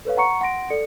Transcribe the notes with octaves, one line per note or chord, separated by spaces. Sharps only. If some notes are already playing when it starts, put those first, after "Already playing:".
A4 B4 C#5 F5
F#5 A#5 C#6 C#7
F#5 C6 A#6 D7
A4 D5 C#7